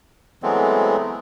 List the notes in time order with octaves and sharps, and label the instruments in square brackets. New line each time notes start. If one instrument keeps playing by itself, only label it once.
[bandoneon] E3 F#3 G#3 A3 B3 C4